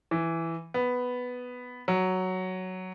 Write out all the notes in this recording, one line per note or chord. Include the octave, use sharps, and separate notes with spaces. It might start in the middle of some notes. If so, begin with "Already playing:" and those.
E3
B3
F#3